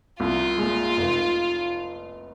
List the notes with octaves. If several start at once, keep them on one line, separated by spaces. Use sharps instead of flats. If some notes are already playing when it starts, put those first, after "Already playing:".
C2 F4
A#2 G#3
F1